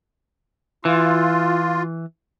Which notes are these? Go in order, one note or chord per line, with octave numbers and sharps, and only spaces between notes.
E3 F4